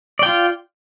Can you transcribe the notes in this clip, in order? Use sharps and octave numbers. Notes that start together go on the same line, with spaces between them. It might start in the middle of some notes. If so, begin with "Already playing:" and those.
F4 D5 G5